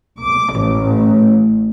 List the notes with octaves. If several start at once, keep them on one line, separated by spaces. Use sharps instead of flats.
D6
A1